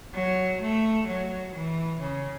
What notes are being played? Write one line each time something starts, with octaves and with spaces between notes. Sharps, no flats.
F#3
A3
F#3
E3
C#3